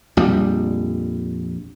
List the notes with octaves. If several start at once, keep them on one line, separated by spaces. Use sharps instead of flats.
A#1 F2 G3